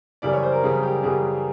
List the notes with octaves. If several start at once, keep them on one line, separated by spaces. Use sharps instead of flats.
F#2 C#3 E3 G3 D5
C#5
C5
A#4
F#2 C#3 E3 G3 G#4
G4
F#2 C#3 E3 G3 G#4